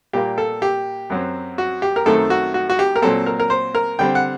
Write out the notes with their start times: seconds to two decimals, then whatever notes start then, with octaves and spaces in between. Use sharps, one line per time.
0.13 A#2 G3 A#3 G4
0.38 A4
0.62 G4
1.10 F#2 F#3 C4
1.58 F#4
1.82 G4
1.96 A#4
2.06 F#2 D#3 A3 C4 A4
2.30 F#4
2.54 F#4
2.70 F#4
2.79 G4
2.96 A#4
3.02 A#2 F#3 C4 A4
3.26 A#4
3.40 A#4
3.50 C5
3.75 A#4
3.99 D3 G3 C4 G5
4.15 F#5